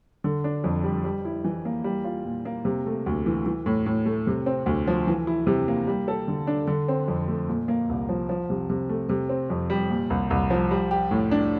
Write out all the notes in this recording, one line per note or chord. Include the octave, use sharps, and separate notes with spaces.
D3
D4
F2
G3
G3
E4
E3
A#3
G3
F4
A#2
A#3
C3
A3
D2
E3
E3
A2
A2
A3
C3
C4
D2
F3
E3
E4
C3
A#3
G3
A4
D3
D4
D3
C4
F2
A3
A#2
A#3
C2
F3
F3
C3
C3
A3
C3
C4
F2
G3
A#2
C2
C2
F3
G3
G4
A2
D4